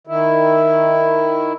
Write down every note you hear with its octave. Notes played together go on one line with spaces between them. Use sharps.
D#3 E4